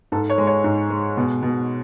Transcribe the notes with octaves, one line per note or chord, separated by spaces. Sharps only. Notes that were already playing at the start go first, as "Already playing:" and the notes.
G#2 A4
C#5
G#3
C#5
G#2
G#3
B2
B2